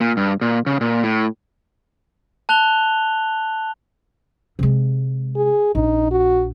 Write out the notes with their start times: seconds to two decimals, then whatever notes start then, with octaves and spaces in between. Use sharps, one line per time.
0.01 A#2
0.17 G2
0.41 A#2
0.66 C#3
0.81 A#2
1.03 A2
2.49 A5 F#6 F7 G7
4.59 C3 G#3
5.36 G#4
5.75 A#1 D#4
6.11 F#4